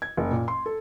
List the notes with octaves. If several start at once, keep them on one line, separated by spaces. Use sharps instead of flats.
G#6
F#1
A#2
C6
A4